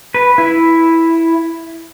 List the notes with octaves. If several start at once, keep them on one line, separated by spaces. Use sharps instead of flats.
B4
E4